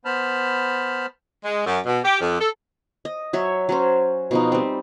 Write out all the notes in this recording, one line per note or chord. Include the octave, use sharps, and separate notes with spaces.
B3 C5 A5 B5 F6
G#3
F#2
B2
G4
F2
A4
D#5
F#3 C#5 E5
F#3 C#4 C5
B2 F3 D#4
G3 C4